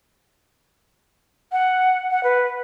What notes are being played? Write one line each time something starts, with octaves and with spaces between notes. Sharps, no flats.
F#5
F#5
B4